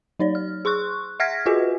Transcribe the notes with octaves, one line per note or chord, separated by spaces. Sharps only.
F#3 D#4 C#5 D5
F6
G#4 C6 C#6 F#6
E5 F#5 F6 G#6 A#6 B6
F4 F#4 G#4 B4 D#5 G#5